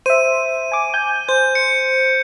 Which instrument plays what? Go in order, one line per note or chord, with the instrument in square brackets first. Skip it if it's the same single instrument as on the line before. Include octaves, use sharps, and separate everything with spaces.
[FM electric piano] C5 E5 [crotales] D#7
[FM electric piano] G#5 D6
G#5 G6
[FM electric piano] C5 [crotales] G6
[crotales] C#7